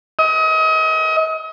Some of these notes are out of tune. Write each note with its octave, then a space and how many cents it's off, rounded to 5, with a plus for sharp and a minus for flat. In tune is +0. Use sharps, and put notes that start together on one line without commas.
D#5 +35